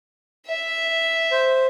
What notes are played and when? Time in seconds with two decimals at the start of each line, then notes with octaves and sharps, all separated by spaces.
0.46 E5
1.31 C5